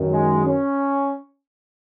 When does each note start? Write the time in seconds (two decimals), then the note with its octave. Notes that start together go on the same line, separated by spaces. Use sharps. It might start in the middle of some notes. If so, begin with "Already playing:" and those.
Already playing: F#2 D#3
0.12 G#3
0.45 C#4